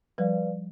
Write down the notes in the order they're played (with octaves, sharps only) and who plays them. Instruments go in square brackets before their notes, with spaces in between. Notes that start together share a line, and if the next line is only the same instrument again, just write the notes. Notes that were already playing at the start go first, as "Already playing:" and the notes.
[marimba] F3 G3 [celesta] B4 D5 F5